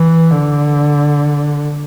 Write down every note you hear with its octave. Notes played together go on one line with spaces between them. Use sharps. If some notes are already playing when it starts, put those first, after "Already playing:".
Already playing: E3
D3